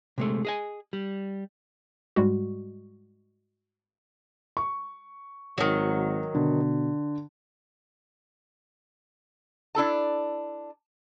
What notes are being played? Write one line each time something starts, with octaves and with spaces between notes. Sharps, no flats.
C3 G#3 A3
G#4 D#5 G#5
G3
G#2 G3 G#3 F#4
C#6
G#1 D#3 F#3
B2 D3
D4 E4 A4 A5